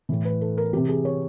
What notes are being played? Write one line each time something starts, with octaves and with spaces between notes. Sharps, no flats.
A2 E3
B4
A4
A#4
C3 E3 G4
G#4
C#5